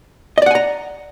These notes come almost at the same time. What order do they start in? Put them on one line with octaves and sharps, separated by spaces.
D#5 D5 F#5 G#5 A#5